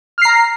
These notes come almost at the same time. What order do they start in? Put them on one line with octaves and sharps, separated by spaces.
F6 C7 A#5